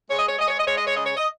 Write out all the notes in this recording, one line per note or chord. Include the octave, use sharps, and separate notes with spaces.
G#3 C#5
D#5
C#5
G#3 D#5
C#5
D#5
G#3 C#5
D#5
C#5
C#3 D#5
C#5
D#5